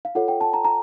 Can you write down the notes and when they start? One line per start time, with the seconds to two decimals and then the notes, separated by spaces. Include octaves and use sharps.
0.05 F5
0.15 F4 A4 C#5 F#5
0.28 G5
0.41 A5
0.53 A#5
0.65 A#5